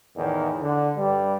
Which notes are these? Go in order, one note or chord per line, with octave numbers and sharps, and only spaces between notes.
E2 A2 D#3
D3
G2 G3